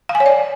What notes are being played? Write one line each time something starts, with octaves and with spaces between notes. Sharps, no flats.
F5
G#5
C#5
D5